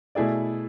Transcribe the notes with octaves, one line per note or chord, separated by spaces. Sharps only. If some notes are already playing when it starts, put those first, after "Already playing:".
B2 A3 E4 G#4 D5